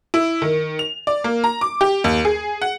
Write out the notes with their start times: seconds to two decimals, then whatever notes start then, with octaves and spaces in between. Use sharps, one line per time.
0.14 E4
0.42 D#3
0.79 F7
1.07 D5
1.24 A#3
1.44 A#5
1.61 D6
1.81 G4
2.04 D#2
2.25 G#4
2.61 F#5